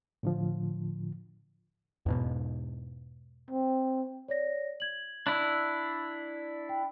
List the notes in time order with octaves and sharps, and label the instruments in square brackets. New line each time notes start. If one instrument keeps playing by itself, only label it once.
[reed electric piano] A2 D3 F3
[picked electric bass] E2 G#2 B2
[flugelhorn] C4
[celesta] C#5 D5 A#6
G#6 F#7
[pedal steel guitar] D4 E4
[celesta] G5